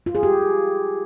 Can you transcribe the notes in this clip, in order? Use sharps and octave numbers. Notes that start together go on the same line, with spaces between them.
F4
G#4
G4